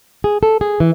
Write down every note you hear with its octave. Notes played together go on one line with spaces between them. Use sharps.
G#4
A4
G#4
E3